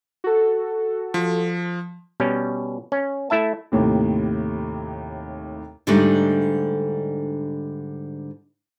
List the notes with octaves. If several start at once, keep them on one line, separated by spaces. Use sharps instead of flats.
F#4 A4
F3
B2 G3 C#4
C#4
A3 E4 E5 A5
D#2 A2 C3
G#2 D3 G3 A3 D4 D#4